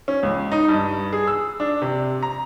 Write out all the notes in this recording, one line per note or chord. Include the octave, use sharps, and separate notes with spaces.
C#4
C#2
D#4
G2
G#4
E6
D4
C3
A#5